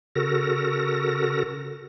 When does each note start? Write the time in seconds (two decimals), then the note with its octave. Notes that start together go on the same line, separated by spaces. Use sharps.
0.16 C#3 F#4 A4 A#4 A#6